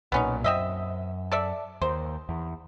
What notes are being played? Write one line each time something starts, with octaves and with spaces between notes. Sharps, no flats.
B1 A#2 B3 C#4 D#4
F#2 C4 D#5 E5
A4 D5 E5
D#2 C5
E2